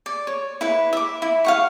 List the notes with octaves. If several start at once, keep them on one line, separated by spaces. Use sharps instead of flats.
D5
C#5
E4 B4
E5 D6
E4
F5 F#5 C#6